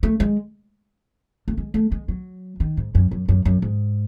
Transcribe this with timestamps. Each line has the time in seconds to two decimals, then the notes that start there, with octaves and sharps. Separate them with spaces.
0.03 A3
0.20 G#3
1.48 A3
1.57 G#3
1.74 A3
1.92 G#3
2.08 F#3
2.60 D#3
2.77 G#2
2.95 F#2
3.11 F#2
3.29 F#2
3.45 F#2
3.62 G#2